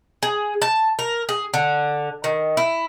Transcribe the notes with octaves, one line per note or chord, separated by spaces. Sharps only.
G#4
A5
A#4
G#4
D3
D#3
E4